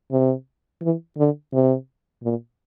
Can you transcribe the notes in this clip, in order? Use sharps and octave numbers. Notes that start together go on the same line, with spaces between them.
C3
E3
D3
C3
A#2